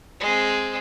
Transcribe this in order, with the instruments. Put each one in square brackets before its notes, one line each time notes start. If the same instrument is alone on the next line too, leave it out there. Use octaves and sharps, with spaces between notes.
[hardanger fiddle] G#3 C4